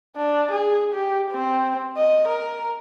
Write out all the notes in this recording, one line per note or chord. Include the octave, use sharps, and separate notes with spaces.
D4
G#4
G4
C4
D#5
A#4